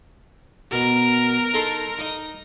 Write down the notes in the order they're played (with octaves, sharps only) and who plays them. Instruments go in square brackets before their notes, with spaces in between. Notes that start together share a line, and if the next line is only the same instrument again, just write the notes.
[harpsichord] B2 [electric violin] A#4
[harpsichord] D#4 A4 C6
D#4 D#5